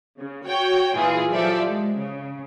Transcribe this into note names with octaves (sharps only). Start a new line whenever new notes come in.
C#3
F#4 C#5 G5
A#2 E3 F4 G#4
F3 F#3 G4 A4 D5 E5
G#3
C#3